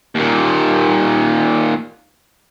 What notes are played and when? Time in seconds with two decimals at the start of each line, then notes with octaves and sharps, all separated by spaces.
0.15 D#2 A#2